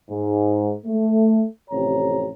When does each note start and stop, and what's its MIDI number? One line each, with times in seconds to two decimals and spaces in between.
0.10 0.72 44
0.86 1.44 57
1.70 2.29 33
1.70 2.29 41
1.70 2.29 48
1.70 2.29 73
1.70 2.29 82